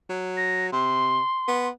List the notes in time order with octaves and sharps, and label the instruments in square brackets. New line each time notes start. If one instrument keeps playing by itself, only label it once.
[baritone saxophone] F#3
[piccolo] A#6
[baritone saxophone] C3 [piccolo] C6
[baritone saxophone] B3